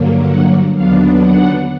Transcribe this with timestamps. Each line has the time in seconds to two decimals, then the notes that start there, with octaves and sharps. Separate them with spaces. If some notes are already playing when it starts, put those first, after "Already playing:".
Already playing: G2 D3 F#3 A#3
0.26 F#5
0.74 D#2 D3 F#3 B3 D4 F5
1.20 F#5